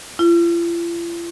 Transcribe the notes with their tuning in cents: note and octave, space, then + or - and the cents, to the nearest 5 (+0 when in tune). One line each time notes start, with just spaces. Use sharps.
F4 -45